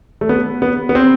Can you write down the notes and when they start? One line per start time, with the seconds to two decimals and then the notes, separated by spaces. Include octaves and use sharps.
0.21 A3
0.29 B3
0.62 B3
0.89 B3
0.95 C4